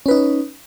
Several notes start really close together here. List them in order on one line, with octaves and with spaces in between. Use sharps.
C#4 B4 D#4